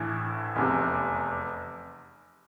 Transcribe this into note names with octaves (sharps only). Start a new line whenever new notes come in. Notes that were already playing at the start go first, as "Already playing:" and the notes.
Already playing: A#1 A2 E3 A3 E4
F1 E2 C3